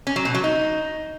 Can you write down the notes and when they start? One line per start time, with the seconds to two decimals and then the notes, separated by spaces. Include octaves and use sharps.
0.07 C#4
0.16 F#3
0.25 B2
0.34 F#3
0.44 D#4